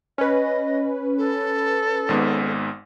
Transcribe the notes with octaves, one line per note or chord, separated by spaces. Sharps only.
C#4 B4 D#5
A4
G#1 G#2 B3